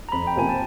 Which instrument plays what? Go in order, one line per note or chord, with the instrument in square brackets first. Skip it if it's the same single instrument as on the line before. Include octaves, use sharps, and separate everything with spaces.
[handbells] A#5
[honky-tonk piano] F2 [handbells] B5
[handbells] G5
[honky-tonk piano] C3 F3 A#3 [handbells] G#5
[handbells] A5